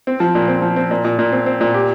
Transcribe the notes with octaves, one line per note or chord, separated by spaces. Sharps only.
C4
F3
A#2
C4
F3
C4
A#2
A#2
A#2
C4
C4
A#2
G4